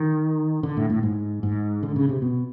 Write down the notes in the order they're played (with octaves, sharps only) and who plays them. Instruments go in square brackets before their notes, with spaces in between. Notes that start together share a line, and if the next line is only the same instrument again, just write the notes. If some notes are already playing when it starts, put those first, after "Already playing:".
Already playing: [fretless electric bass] D#3
D3
A2
A2
G#2
G#2
D3
C#3
C3
B2